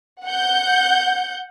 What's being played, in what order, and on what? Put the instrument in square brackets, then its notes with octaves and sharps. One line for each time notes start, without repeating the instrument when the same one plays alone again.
[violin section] F#5 G6